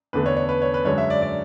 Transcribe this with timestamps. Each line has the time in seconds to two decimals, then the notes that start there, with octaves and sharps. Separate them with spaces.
0.13 E2 D3 A3 B4
0.26 C#5
0.37 C#5
0.49 B4
0.62 C#5
0.74 B4
0.85 F#2 D3 G#3 C#5
0.98 E5
1.10 D5
1.22 D5